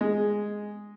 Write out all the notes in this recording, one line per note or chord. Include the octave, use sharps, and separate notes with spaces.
G#3